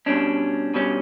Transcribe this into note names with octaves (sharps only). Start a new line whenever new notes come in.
B2 G3 C#4 D4
B2 G3 C#4